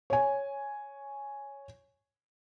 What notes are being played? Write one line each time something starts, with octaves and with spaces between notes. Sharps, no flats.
C#5 G#5